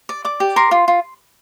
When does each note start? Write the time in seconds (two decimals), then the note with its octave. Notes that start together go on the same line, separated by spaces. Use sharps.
0.09 D5
0.25 D5 D6
0.40 G4
0.56 A#4 C6
0.71 F4
0.88 F4